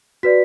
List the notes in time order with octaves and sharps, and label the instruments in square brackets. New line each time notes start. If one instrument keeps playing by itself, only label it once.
[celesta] F#4 B4 D5 B6